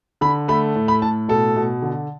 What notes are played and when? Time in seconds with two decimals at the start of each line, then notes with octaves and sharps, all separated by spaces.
0.21 D3 B5
0.48 A3 B5
0.75 A2
0.88 B5
1.02 A2 A5
1.28 B2 A4
1.56 B2
1.82 D3